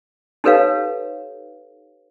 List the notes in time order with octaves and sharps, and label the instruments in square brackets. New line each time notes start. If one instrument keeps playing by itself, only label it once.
[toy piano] D#4 G4 A4 B4 C#5 F5